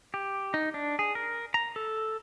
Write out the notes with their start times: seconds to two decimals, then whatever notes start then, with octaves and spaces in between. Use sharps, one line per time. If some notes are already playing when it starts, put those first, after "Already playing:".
0.14 G4
0.54 D#4
0.74 D4
0.99 G#4
1.15 A#4
1.54 A#5
1.76 A4